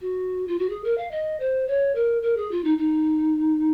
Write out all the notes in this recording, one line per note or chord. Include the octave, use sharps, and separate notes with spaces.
F#4
F4
F#4
G#4
A#4
F5
D#5
C5
C#5
A#4
A#4
G#4
F4
D#4
D#4